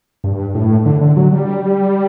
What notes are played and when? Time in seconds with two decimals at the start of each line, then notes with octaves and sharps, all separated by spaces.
0.24 G2
0.55 A2
0.86 D3
1.01 D3
1.17 F#3
1.33 G3